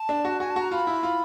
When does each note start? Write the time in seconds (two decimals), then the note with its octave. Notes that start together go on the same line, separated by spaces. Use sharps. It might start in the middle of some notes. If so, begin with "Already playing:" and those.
Already playing: A5
0.09 D4
0.25 F#4
0.40 F#4 G#5
0.50 A5
0.56 F#4
0.61 A#5
0.71 F4 B5
0.87 E4
1.03 F4